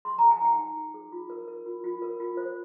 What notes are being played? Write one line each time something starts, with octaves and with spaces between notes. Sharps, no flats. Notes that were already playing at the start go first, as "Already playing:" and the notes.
G#4 C6
G#4 A#5
G#5
D#4 G5
D#4
D#4
G#4
F4
A#4
A#4
F4
F4
A#4
F4
C5